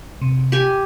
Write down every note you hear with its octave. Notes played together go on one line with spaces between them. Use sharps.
C3
G4 G#5